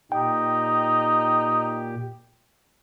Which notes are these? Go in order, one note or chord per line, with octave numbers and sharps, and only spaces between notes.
A#2 D#4 G4 G5